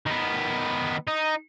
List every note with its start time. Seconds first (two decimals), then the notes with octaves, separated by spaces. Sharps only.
0.06 D#3 B3
1.07 D#4